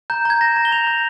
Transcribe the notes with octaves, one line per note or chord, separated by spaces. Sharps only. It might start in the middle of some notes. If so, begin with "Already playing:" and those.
A#5 G6
A#5 G#6
A#5 A#6
A#5
G7
A#5 F7
A#5 G6